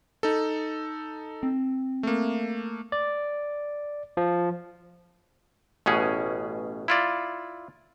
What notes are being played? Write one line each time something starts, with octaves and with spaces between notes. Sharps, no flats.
D#4 A4
C4
A3 A#3
D5
F3
A1 B2 C#4 G#4
E4 F4 D5